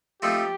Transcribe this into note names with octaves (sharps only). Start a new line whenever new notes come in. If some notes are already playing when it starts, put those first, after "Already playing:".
F3 A3 C4 D#4 G4